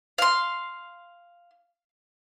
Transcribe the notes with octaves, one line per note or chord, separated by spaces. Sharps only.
F5 C6